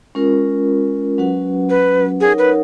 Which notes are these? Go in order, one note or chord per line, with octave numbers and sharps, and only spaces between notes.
G#3 C#4 F4 A#4
F#3 C#4 F#4 B4 F#5
B4
D#4 G#4 A#4 C#5 F#5
B4